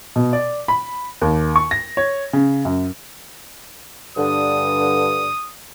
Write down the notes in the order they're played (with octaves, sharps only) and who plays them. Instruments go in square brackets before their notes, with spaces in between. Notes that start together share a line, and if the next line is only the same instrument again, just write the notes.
[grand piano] B2
D5
B5
D#2
C#6
A#6
C#5
C#3
F#2
[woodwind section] G2 D3 [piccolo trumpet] D#6